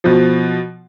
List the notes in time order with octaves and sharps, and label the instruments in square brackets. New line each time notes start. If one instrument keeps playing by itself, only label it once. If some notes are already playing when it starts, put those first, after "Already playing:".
[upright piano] B2 F3